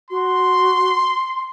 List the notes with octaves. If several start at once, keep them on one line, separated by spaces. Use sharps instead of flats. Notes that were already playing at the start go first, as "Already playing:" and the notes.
F#4 C6